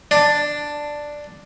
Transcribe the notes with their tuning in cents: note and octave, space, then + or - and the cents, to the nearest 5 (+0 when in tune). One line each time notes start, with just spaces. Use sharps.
D4 +5